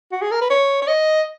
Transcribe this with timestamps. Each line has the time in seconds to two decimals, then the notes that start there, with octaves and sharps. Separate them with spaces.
0.12 F#4
0.22 G#4
0.31 A#4
0.41 B4
0.50 C#5
0.82 C#5
0.88 D#5